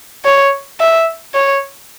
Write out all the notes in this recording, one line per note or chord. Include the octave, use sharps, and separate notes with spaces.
C#5
E5
C#5